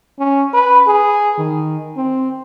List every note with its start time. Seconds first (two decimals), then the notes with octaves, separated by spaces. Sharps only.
0.19 C#4
0.54 B4
0.87 G#4
1.38 D#3
1.97 C4